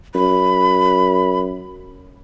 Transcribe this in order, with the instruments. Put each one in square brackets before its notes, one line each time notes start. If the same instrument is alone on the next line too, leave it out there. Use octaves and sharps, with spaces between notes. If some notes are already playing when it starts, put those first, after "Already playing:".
[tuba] F#2 [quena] B5